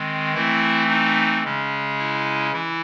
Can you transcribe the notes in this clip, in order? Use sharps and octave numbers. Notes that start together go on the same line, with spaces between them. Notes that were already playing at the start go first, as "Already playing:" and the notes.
Already playing: D#3 G#3 C4
E3 A3 C4 E4
D#4
C#3 G#3 C#4
E4
E3 E4